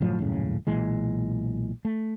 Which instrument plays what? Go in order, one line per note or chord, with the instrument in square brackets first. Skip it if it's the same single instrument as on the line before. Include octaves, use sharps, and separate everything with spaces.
[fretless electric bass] F#1 A2 F3 F#3
D#1 F#2 A2 C#3
B1 A#2 E3 G#3
A3